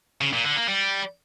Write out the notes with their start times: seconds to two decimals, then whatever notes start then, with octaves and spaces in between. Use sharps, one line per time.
0.21 C#3
0.33 A#2
0.45 D3
0.56 A#3
0.68 G3